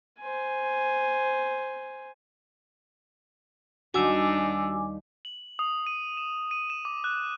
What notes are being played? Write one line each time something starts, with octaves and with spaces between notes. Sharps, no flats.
C5 G#5
D#2 G3 D4 D#4 F#4 G#5 D6 E6
F#7
D#6
D#7
E7
D#7
E7
D6
F#6